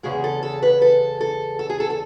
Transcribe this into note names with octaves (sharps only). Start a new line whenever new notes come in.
E2 C#3 G#3 G#4
A4
A4
B4
A4
A4
A4
G#4
A4
A4